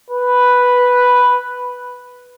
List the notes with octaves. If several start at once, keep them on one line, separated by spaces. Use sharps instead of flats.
B4